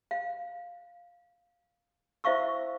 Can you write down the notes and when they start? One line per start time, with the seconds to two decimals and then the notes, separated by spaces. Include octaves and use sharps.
0.11 F5
2.24 E4 C5 E5 F5 C#6 E6